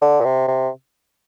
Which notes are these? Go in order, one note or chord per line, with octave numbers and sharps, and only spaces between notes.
D3
A#2
C3
C3